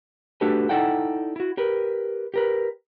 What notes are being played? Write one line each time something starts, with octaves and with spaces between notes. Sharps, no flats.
A3 D4 F#4 G4 A4 B4
D#4 E4 A4 D5 F#5 G5
E4 F#4
G4 A#4 B4
G4 A#4 B4